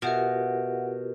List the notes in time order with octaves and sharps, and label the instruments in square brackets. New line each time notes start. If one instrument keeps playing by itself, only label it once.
[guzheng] B2 [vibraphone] F4 G4 A#4 [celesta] E5 F#5 D7